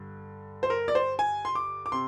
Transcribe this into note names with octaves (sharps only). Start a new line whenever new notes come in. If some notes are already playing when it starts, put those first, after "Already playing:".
Already playing: G2 D3
C5
A#4
D5
C5
G#5
C6
D6
D6
C3 C6